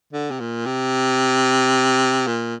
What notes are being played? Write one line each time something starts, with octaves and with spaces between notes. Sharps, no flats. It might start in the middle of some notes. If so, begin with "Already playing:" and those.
D3
C3
A#2
C3
A#2